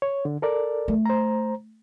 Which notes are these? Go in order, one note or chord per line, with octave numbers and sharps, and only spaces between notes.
C#5
D3
A4 A#4 D5
A3
C5 A#5